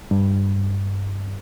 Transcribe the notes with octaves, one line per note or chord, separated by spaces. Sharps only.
G2